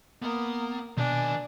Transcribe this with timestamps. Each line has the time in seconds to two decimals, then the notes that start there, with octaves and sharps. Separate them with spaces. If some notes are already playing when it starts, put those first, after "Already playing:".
0.22 A#3 B3
0.97 B2 D#3 D4 G#5